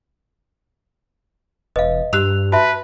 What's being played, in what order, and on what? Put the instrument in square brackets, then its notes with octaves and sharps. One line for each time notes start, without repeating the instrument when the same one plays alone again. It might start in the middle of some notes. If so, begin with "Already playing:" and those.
[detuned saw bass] E1 [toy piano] B4 F5 [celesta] D#5
[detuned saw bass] G2 [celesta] G4 F#6 F7 [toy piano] A#5 E6
[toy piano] F#4 E5 [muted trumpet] B4 [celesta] A5